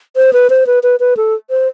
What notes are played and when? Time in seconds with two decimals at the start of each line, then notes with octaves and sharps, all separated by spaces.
0.16 C5
0.33 B4
0.50 C5
0.67 B4
0.83 B4
1.00 B4
1.17 A4
1.50 C5